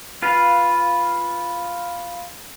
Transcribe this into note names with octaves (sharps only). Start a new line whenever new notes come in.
F4 B4 F5